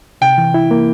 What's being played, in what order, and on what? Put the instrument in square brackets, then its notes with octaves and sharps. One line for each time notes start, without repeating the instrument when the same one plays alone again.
[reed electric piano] C3 [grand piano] G5
[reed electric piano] E3
E4
A#3